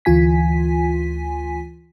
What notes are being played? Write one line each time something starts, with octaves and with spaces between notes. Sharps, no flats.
D2 E3 F4 G#5 B6